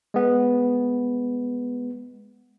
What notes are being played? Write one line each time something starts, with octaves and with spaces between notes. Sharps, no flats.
G#3 B3